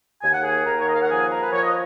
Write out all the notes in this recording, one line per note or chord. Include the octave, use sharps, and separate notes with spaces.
D#2 G#5
F#5
G#4 G#5
D#2 A#4 A#5
C#5
D#5
F5
F#5
F3 G#4 G#5
A#4 A#5
B4
F3 C#5
D#5